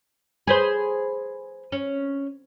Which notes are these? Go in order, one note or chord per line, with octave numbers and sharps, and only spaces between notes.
G#4 B4 C5
C#4